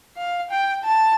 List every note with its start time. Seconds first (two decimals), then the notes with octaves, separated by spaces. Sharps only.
0.17 F5
0.50 G5
0.84 A5